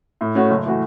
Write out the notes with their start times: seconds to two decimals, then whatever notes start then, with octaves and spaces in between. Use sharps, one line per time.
0.21 A2
0.35 A3 C#4 F#4
0.50 F#1
0.66 E3 A3 F#4